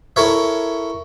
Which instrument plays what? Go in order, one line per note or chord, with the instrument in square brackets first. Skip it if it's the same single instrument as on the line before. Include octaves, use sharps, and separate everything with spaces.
[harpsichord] E4 A4 A#4 C#5 E5